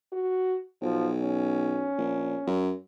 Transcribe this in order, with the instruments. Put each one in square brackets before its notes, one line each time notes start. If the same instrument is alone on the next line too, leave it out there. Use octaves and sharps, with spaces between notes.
[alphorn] F#4
[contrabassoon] B1 [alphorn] F3
[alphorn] C#4
[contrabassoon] A#1
F#2